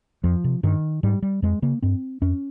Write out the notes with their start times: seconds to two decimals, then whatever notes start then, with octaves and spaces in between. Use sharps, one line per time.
0.24 F2 F3
0.44 C3
0.63 G2 D#3
1.03 G#2 G3
1.23 G3
1.42 F2 G#3
1.62 C#3 A#3
1.82 G2 C4
2.22 F2 C#4